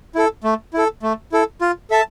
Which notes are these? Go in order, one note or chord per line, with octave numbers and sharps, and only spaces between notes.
E4 A4
A3
E4 A4
A3
E4 A4
F4
A4 E5 A5